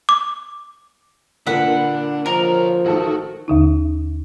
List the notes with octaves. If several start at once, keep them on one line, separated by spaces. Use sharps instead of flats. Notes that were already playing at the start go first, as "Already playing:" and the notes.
D6
A#2 D3 A#3 D4 B4 F#5
F3 A#4 C#5 D#5
A1 D#3 F#4 A4
D#2 D3 D#4